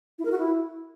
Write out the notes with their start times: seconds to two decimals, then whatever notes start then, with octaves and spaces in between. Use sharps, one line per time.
0.19 E4
0.25 A#4
0.32 F#4
0.38 E4